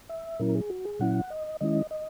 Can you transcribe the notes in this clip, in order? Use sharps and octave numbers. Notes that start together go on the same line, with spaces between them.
E5
A#2 F#3 C#4 E4 A#4
G#4
F#4
G#4
A#2 F#3 C#4 E4 F#5
D#5
D#3 G#3 C#4 E4 D#5
D#5